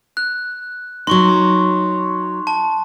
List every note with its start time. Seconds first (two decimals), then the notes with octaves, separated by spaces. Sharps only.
0.17 F#6
1.07 F#3 D#4 C6 C#6
2.47 A5